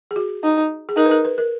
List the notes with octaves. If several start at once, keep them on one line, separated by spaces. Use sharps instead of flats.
G#4
F#4
D#4
G#4
D#4 A#4
B4
A#4
B4
A#4